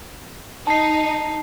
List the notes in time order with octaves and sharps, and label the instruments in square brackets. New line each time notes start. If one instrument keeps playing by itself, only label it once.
[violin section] D#4 [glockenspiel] A5 C7